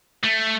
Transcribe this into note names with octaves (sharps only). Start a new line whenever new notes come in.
A3